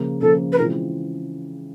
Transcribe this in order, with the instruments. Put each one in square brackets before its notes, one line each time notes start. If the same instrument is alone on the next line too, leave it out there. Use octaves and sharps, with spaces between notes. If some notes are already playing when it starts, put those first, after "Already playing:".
Already playing: [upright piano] C#3 F3 A#3
[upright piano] C#3 F3 A#3 [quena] A4
[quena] B4
[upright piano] C#3 E3 G#3 C4 F4 [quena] A#4